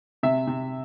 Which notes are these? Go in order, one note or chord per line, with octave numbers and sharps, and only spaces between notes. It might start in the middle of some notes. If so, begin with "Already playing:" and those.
C3 E5
C3